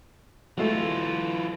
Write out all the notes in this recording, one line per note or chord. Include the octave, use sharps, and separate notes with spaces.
E3 F#3 G#3 A3 F4